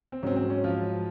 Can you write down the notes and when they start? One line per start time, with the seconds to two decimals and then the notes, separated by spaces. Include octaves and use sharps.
0.12 C4
0.23 G#2 F#3 C4 C#4
0.36 C4
0.50 C#4
0.64 F3 F4